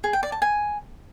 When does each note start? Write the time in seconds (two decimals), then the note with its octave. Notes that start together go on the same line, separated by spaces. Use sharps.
0.04 G#4
0.13 G5
0.23 D5
0.32 A5
0.42 G#5